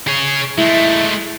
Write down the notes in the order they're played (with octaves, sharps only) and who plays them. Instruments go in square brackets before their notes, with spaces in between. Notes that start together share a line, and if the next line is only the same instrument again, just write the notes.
[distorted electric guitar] G#4 C#5
[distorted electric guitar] G#3 A3 [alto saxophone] E4